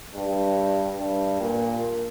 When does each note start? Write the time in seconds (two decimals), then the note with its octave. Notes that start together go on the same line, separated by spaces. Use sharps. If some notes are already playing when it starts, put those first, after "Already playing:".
0.15 G2
0.99 G2
1.41 A#2